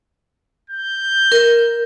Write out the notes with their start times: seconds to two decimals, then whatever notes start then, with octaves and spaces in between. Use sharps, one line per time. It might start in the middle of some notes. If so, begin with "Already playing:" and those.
0.70 G6
1.32 A#4